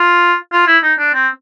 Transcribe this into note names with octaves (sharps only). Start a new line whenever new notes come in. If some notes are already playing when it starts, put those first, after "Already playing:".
Already playing: F4
F4
E4
D#4
D4
C4